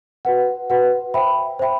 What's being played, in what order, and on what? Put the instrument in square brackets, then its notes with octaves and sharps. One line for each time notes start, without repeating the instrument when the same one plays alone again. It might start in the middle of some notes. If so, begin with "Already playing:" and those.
[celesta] F#4 B4 F#5
F#4 B4 F#5
C5 E5 G5 B5
C5 E5 G5 B5